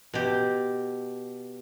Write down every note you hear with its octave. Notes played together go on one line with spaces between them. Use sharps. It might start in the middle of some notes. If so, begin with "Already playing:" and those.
B2 G4